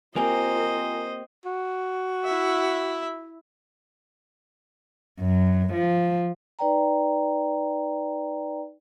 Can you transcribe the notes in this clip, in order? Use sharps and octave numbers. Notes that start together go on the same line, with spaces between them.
A#3 C4 F4 G4 A#4 C5 D#5 G#5
F#4
E4 E5
F#2
F3
D#4 B4 D5 G5 A#5